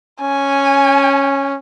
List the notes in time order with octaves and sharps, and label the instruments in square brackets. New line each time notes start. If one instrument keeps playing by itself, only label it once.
[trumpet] C#4 [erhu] G#5